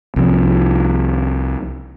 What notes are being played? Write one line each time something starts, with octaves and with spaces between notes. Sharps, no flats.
C2 F3